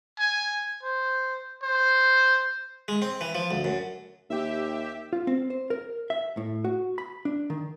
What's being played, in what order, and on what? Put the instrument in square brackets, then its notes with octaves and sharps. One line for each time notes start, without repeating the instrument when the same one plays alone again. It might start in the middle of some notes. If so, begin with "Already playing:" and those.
[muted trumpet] G#5
C5
C5
[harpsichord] G#3
C4
E3
F3
D2
F#2
[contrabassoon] D#2 [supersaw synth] G4 E5
[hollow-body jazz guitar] F4
C4
C5
A#4
E5
A2
F#4
B5
D4
D#3